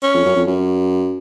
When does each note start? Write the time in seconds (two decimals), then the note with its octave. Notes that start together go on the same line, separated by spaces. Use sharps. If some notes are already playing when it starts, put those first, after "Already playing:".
0.03 C#4
0.14 F2
0.25 F#2
0.36 F2
0.47 F#2